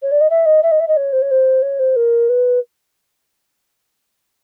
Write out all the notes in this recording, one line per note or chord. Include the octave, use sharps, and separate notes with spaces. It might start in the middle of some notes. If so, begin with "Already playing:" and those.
C#5
D5
D#5
E5
D#5
E5
D#5
E5
D#5
C#5
C5
C#5
C5
C#5
C5
A#4
B4